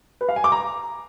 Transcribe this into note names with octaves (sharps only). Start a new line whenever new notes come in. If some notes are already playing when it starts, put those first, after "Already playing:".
B4
F5
G#5
D6
A#5